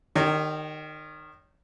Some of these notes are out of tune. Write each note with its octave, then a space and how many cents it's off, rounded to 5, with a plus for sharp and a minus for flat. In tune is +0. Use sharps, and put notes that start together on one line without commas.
D#3 -25 G4 +0 C#5 +25